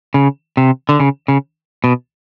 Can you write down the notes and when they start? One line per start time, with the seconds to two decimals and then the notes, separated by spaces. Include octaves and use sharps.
0.14 C#3
0.57 C3
0.89 D3
1.00 C#3
1.28 C#3
1.84 B2